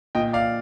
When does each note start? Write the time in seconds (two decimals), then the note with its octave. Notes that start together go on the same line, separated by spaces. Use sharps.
0.15 A#2 D#5 G5
0.33 D5 F5